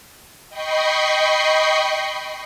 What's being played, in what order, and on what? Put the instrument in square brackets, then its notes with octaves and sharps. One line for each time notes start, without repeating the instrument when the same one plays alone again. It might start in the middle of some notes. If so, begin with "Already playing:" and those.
[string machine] D#5 G5 B5 C#6 C7